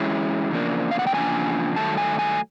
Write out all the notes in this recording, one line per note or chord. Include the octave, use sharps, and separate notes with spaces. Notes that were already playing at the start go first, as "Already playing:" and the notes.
Already playing: E3 G#3 C#4 E4 A5
E2 C#3 F3 A#3 D4
F5
F#5
G5
E2 C#3 F3 A#3 D4 G#5
G2 D#3 F#3 A3 A5
G#5
G#5